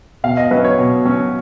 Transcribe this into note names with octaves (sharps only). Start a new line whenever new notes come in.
B2 F5
D#5
F#3 C#4 B4
C#5
B2
F#3 C#4